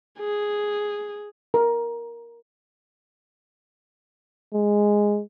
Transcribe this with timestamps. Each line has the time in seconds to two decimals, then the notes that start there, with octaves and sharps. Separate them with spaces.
0.19 G#4
1.54 A#4
4.54 G#3